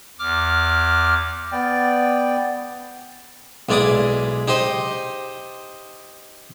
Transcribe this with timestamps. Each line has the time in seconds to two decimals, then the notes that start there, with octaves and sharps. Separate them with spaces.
0.19 E2 D6 F6
1.52 B3 D5 G5
3.69 B1 G#3 E4 D5 D6 D#6
4.48 D#4 G4 C5 D#5